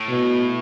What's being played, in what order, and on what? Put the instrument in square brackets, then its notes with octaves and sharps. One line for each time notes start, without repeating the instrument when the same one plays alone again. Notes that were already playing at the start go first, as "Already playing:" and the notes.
Already playing: [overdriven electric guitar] A2
[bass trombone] B2